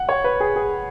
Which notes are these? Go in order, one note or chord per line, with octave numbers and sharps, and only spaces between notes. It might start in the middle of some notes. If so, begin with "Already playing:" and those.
Already playing: F#5
C#5
B4
G#4
G#4